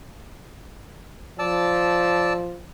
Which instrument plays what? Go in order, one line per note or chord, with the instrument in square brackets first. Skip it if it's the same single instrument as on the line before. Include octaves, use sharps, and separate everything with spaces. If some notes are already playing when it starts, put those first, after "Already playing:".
[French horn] F3 [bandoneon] D5 A5 E6